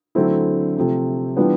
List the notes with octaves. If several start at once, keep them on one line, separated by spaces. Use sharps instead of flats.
D3 F#3 A3 C4 E4
C3 F3 A3
E3 G3 B3 D4 F4